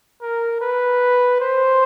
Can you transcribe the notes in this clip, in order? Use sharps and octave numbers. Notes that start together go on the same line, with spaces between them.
A#4
B4
C5